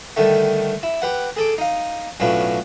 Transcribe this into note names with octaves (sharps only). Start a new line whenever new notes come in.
D3 D#3 G3 A3
E4
G4 B4 F#5
G#4 A4 D6
D#4 F5
B1 A2 C#4 D4 F4 B4